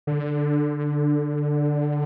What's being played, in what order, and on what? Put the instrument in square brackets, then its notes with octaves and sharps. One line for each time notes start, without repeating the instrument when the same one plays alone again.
[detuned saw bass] D3